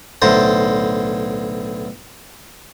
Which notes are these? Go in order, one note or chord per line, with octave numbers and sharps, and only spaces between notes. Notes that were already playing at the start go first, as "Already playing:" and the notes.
B1 A2 D3 C5 A#5